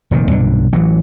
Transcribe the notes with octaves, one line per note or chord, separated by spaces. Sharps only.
F1 A#2 D#3
B1 G2 A#2 D3
A1 E3 F#3